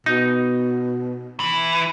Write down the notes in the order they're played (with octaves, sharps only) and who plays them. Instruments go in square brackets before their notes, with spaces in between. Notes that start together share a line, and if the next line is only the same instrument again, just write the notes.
[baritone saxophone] B2 [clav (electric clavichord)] D#4
[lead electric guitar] E3